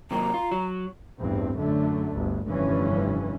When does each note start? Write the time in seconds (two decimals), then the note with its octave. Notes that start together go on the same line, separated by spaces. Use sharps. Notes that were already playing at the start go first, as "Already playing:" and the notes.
0.11 C3 F#3 A#3 A#5
0.34 F4
0.52 F#3
1.19 A1 E2 G2 C4
1.59 F#2 D3 A3
2.15 G1 D2
2.49 F1 G2 D3 E3 F3 C#4